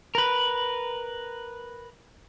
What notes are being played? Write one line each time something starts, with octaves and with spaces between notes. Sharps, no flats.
A#4 B4